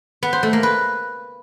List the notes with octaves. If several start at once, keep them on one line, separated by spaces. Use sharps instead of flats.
B3
C5
A3
A#3
B4